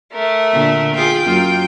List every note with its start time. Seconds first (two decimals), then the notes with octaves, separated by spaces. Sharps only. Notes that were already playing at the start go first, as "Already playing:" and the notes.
0.13 A3 A#4
0.52 A#2 D3
0.95 F4 G#4 G5
1.25 F#2 A#3 F4